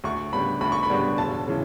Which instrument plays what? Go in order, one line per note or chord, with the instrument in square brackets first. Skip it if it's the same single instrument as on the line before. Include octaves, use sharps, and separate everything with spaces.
[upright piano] D2 C#6
C#3 G3 B3 D4 B5
D2 B5
C#6
B5
C#3 G3 B3 D4
E1 A5
C#3 E3